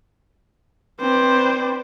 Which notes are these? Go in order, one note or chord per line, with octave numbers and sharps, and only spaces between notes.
C4 B4 C5 D5